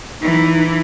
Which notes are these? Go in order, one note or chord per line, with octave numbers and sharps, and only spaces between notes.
E3 D#4